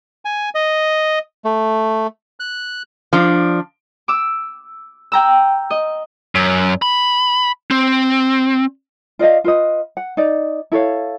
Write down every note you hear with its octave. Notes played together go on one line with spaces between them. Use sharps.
G#5
D#5
A3
F#6
F3 D4
D6 E6
G5 A#5 E6
D#5
F#2
B5
C4
F4 D5 D#5 F5
F4 B4 D#5
F#5
D#4 D5
E4 A4 C#5 F5